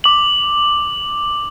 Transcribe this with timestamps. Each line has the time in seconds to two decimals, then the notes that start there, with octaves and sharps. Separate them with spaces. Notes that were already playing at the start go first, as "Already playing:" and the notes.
0.04 D6 F#7